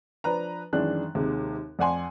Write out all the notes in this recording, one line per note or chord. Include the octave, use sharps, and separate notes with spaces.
F3 D4 B4 A#5
F#2 D#3 E3 G#3 D4 F#6
D#2 C3 G#3
F2 D5 F#5 G#5 C6